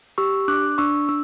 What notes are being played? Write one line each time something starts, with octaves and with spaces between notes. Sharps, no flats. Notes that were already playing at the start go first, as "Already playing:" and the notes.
G4 C#6 E6
D4 D6 F#6
D4 C#6 E6
D4 E6